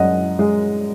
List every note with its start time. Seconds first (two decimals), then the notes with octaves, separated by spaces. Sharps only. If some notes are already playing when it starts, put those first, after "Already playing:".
Already playing: F#2 G#3 D#5 F#5
0.39 G#3